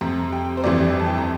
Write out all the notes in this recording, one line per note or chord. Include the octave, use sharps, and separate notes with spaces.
F2 C3 G3 C4 A#5
G5
C5
G1 F2 E3 G3 D5
A5
G5
A#5